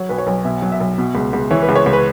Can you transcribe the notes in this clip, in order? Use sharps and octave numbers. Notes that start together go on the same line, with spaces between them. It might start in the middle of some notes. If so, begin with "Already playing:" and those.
Already playing: F#3 C#5
B1 B4
C#5
B1
B2 E5
F#3
E5
B1
B2
C#2
C#2
E3 C#5
B4
C#2
C#5
C#2
B4